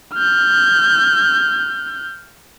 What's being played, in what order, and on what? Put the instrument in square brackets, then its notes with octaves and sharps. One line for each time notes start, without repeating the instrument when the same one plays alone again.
[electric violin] F6 G6